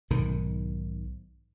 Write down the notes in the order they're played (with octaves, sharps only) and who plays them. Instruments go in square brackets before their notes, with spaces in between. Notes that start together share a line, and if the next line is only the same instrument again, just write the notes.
[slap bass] B1 G#2 D#3